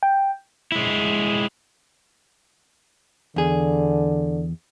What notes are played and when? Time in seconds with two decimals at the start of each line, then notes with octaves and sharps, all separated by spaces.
0.03 G5
0.72 G#3 E4
3.36 E2 D3 G#4